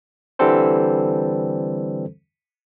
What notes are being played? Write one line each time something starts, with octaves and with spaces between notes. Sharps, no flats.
D3 E3 G3 C4 A4 C5